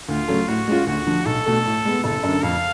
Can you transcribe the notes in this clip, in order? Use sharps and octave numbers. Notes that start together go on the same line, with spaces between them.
D2 F4
C#3 F#3 A3
A2 F#4
G#3 C#4 F4
D2 F#4
D3 F3
B1 A4
B2 A3
A2
G#3 B3
F#1 A4
F#2
D3
F2 F5